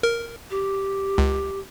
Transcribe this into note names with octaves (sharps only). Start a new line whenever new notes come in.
A#4
G4
C#2